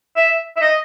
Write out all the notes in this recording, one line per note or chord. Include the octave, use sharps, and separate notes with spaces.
E5
E5
D#5